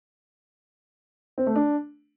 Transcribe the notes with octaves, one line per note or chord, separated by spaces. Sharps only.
C4
A3
D4